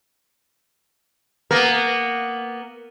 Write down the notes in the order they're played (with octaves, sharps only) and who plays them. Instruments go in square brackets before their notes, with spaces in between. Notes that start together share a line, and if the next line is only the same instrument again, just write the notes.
[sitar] A#3 B3 A#4